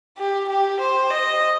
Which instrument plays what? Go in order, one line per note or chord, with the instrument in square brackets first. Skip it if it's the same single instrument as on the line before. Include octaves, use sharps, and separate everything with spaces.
[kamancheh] G4
G4
C5
D#5